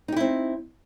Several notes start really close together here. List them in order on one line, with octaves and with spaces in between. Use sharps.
D#4 G4 E4 C4